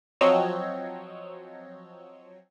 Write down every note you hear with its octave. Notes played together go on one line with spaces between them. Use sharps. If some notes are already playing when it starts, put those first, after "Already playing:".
F3 F#3 C4 C#5 D#5 E6